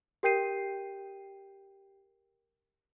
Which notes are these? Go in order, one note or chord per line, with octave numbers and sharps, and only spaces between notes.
G4 A#4 G5 G6 C7 D#7